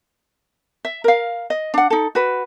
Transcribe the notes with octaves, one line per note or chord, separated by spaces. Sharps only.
E5
A#4 F5
D#5
D4 F#5
D#4 A4
F#4 B4